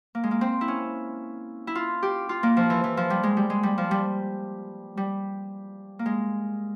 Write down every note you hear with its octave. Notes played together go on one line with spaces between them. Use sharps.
A#3
G#3
A#3
C4
E4
C#4
E4
F4
G4
F4
A#3
F3
E3
E3
F3
G3
G#3
G3
G#3
G3
F3
G3
G3
A#3
G#3